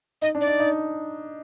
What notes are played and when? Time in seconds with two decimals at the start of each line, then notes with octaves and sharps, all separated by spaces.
0.22 D#4 D#5
0.35 D4
0.41 D5
0.47 D#4
0.59 D#4